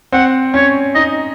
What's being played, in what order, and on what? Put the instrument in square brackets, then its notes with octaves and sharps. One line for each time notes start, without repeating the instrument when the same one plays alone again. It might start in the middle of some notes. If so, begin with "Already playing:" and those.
[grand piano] C4 [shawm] F#5
[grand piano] C#4 [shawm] C#5
[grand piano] D#4 [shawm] D#5